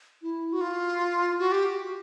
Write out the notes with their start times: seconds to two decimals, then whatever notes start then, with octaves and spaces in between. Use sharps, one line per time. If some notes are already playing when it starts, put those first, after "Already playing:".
0.22 E4
0.53 F#4
0.61 F4
1.39 F#4
1.52 G4